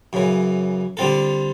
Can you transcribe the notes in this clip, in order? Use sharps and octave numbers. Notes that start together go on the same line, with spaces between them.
F#2 C#3 E3
D3 G3 C4 F4 A4